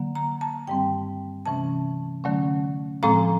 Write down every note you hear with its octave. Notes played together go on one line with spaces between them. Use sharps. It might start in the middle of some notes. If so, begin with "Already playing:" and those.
Already playing: D3 F#3 A#3
A#5
A5
G2 D#3 G3 C4 G5
C3 E3 A3 C#4 A5
D3 F#3 A3 C#4
A2 F3 G#3 C4 A#5